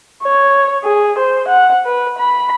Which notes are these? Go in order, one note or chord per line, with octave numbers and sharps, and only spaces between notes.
C#5
G#4
C5
F#5
B4
B5